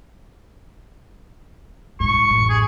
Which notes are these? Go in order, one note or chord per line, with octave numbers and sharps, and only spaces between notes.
A#1 G#2 C#6
A1 F#2
G#4